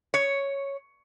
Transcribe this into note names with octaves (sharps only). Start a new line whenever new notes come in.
C#5